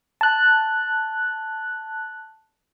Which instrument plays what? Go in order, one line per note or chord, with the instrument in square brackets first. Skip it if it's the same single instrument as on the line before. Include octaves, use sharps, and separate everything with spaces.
[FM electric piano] A5 F#6